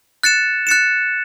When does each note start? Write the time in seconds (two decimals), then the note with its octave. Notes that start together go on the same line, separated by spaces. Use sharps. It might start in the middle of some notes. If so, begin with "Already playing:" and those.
0.23 F#6 A6 C#7 E7
0.67 F#6 A6 C#7 E7